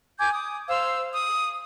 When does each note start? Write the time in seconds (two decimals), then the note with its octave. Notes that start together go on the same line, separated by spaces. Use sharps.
0.20 G#5 D6 G6 G#6
0.34 D6 D#6
0.69 C5 F5 E6
1.13 D#6